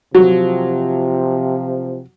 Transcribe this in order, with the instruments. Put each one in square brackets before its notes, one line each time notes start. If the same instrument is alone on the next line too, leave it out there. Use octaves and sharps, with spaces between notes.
[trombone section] C3 F3 [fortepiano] F#3